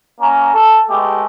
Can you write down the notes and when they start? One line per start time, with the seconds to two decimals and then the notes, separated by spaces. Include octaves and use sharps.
0.20 A#3 C#4 A#5
0.53 A4
0.89 G#3 A3 B3 G4